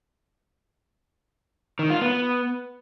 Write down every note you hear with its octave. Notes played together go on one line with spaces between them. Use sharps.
D#3
F4
B3